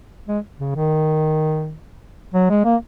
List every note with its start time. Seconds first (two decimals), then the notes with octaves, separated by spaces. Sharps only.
0.28 G#3
0.60 C#3
0.75 D#3
2.34 F#3
2.50 G#3
2.65 A#3